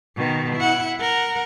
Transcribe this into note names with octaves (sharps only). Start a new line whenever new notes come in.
B2 D#3
E4 F#5
A#4 F#5